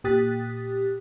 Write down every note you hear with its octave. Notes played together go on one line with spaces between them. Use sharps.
A#2 G4 D#6 F#6 A6 B6